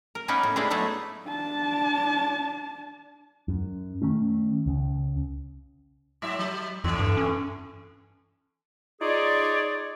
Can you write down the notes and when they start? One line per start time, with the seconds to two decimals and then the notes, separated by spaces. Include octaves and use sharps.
0.15 A#4
0.28 A#3 B3 C#4 D#4 A#4 B4
0.43 A2
0.56 G#3 D4 E4 B4 F5
0.70 F#3 A3 B3 D#4 E4
1.26 D4 A5
3.48 F#2
4.02 D#3 A3 C#4
4.66 C#2 C#3
6.22 G#2 F#3 E5
6.39 F#3
6.84 F2 A2 D3 E3
6.99 G2
7.17 C#4
9.01 D#4 F4 G#4 C#5 D5